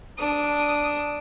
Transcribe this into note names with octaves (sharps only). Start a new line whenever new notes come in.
D4 D#6